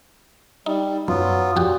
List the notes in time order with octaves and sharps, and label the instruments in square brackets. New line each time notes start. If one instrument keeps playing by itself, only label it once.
[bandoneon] G3 [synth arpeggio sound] D#4
[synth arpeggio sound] F#2 [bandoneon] F#3 B3 F4
[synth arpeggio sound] F2 F#4 G4 [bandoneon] A#2